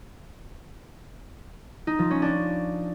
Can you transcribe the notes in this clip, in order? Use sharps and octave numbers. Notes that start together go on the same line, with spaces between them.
D#4
F3
C#4
D4